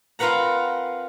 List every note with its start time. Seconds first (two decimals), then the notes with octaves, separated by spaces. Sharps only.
0.19 C4 F4 A#4 B4 F#5 A#5